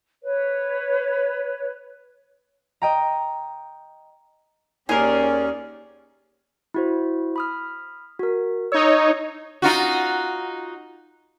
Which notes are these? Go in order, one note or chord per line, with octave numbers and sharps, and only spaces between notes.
B4 C#5
D#5 G5 A#5
D#2 A#3 C#4 D#4 G4 G#4 A#4 D5
E4 F#4 C5
B5 D#6 F6
F#4 A#4
D#4 C#5 E6
D#4 F4 F#4